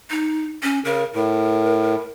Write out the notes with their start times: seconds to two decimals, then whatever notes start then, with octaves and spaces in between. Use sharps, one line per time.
0.11 D#4
0.63 C#4
0.85 C#3 A#4
1.15 A2 A#4